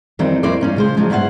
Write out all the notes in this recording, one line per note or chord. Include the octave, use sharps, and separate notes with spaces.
F2 D#3 E3 G3 C4
F2 E3 A#3 C#4 C5 D5
G2 C#4 D#4
C#3 G#3 C5
C#3 F3 F#3 G#3
G2 B3 E4 C5 F#5